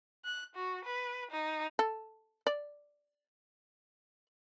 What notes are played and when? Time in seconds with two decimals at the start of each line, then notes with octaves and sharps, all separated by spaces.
0.25 F#6
0.56 F#4
0.85 B4
1.31 D#4
1.79 A4
2.47 D5